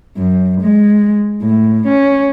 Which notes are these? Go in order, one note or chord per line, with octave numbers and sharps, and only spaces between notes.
F#2
G#3
A2
C#4